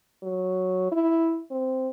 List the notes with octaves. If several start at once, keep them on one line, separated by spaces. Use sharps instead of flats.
F#3
E4
C4